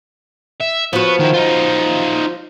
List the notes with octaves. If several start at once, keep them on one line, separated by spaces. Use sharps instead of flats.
E5
F3 B3 F#4
D#3 E4
D#4 F4